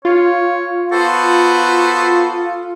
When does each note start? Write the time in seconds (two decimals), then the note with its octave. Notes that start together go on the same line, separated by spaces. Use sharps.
0.05 F4 C#5
0.92 B3 F#4 A4 C5